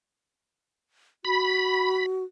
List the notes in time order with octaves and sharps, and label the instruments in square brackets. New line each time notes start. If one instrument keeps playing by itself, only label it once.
[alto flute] F#4 [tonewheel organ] B5